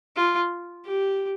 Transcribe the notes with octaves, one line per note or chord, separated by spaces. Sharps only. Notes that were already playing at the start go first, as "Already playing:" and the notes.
F4
G4